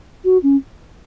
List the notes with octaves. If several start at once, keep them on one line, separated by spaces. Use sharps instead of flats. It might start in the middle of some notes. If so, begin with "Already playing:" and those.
F#4
C#4